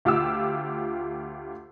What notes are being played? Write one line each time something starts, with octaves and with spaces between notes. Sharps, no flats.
D2 F4 G4 F5 D6 E6